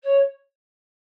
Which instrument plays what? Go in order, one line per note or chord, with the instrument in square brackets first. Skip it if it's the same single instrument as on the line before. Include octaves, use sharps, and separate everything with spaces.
[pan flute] C#5